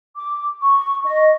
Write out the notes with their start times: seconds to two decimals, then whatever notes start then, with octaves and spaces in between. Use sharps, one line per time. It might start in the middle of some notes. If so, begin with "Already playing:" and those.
0.16 D6
0.61 C#6
1.04 D#5